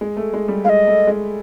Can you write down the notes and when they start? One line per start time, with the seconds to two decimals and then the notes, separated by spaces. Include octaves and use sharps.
0.01 G#3
0.17 A3
0.33 G#3
0.48 G3
0.64 G#3 D#5 F5
0.87 A3
1.07 G#3